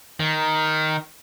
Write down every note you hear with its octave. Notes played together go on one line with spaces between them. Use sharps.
D#3